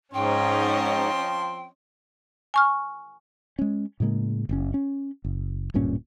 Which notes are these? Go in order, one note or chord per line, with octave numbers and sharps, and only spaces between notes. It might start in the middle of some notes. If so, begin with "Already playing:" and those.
G#2 F3 C4 C#4 C#5 D#5 G5 C6
G#5 C#6 F6
G#3 C#4
A2 C#3 G#3 A#3
F#1 C4 C#4
C#4
F#1
D1 G2 A#2 C#4